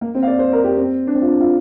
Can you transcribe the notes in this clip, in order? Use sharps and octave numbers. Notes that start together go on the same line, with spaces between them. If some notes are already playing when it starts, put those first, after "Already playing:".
A#3
C4
F5
D5
C5
A#4
G4
C4
D4
C4
F4
D4
F4